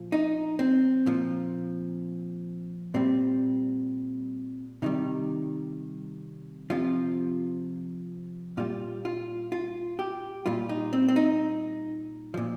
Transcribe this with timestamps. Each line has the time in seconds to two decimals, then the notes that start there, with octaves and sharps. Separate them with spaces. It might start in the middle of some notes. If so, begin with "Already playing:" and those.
Already playing: A#2 F3
0.12 D#4
0.59 C4
1.06 A#2 F3
2.94 A#2 G3 C4
4.82 C3 D#3 G3 D#4
6.70 C3 F3 F4
8.57 A#2 G3 F4
9.05 F4
9.52 F4
9.99 G4
10.46 A#2 G3 F4
10.69 D#4
10.93 C4
11.08 C4
11.16 D#4
12.34 A#2 F3